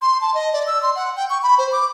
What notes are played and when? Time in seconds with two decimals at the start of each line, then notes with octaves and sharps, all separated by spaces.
0.02 C6
0.21 A5
0.34 D#5
0.53 D5
0.67 E6
0.83 C6
0.96 F#5
1.16 G5
1.30 C#6
1.43 B5
1.58 C5
1.72 D6